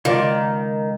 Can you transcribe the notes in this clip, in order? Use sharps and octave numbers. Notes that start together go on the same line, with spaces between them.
C#2 D#3 F4 D5